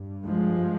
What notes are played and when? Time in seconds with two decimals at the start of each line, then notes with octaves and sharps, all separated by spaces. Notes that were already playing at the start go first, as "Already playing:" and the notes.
Already playing: G2
0.26 F3 G#3